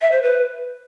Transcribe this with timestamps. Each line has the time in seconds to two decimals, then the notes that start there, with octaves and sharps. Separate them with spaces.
0.01 E5
0.12 C5
0.22 B4